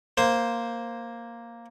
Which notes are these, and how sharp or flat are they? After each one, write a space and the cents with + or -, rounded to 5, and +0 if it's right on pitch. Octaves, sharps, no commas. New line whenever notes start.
A#3 +0 C5 +0